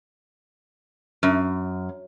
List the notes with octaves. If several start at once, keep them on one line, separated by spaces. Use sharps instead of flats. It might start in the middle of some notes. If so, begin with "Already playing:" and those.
F#2